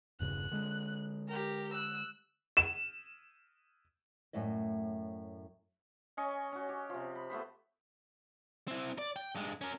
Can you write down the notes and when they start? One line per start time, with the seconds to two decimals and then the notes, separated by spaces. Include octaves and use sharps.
0.20 E1 G2 C#3 F#6
0.52 D3 G#3
1.28 G4 A#4
1.73 E6 F#6
2.57 E7
4.33 F#2 A2 A3 D5 D#5
6.17 C#4 D#5 G#5 C#6
6.52 C#4 F#4
6.69 G4
6.89 C3 F3
7.15 B5
7.30 A3 B3 C5 B5
8.68 C4 E4
8.98 D5
9.16 G5
9.35 G2 G#3
9.61 C#4 A#4